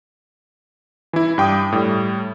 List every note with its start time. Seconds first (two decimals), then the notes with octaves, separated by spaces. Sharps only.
1.13 E3 E4
1.38 G2 G5 D6 D#6
1.72 A2 G3